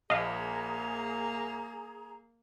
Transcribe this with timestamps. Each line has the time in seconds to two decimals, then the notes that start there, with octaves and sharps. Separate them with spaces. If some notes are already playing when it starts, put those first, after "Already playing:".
0.10 A#1 A#3 G#4 D#5 F5 A#5